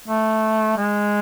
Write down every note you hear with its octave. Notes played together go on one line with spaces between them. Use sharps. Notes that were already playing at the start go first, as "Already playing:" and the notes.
A3
G#3